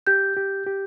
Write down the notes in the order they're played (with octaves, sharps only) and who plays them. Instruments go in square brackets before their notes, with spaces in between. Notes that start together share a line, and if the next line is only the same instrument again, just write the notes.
[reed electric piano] G4 [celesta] G6
[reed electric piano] G4
G4